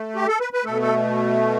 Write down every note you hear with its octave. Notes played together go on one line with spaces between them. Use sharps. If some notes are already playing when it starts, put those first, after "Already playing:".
Already playing: A3
G4
A4
B4
B4
B2 A3 A4
A4